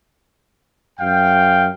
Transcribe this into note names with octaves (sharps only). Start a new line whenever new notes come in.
F#2 F5 G5